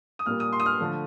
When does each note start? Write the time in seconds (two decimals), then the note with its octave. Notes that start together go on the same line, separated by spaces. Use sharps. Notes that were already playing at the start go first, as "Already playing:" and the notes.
0.19 D#6
0.26 A#2 G3 A#3 F6
0.40 D#6
0.52 C6
0.60 D#6
0.66 F6
0.80 D3 F3 A3